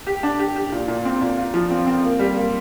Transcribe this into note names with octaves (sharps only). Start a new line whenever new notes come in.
G4
D4
G4
G4
A#2
A#2
C4
A#2
F4
F3
C4
C4
A#3
G3
A#3